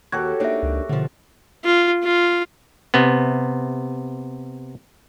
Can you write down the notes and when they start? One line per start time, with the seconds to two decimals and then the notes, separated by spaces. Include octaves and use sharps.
0.12 D#2 F#4 G4 A4 G#6
0.40 A#3 D4 D#4 C#5 E5
0.63 C#2
0.89 B2 D3 F3
1.64 F4
2.04 F4
2.94 C3 B3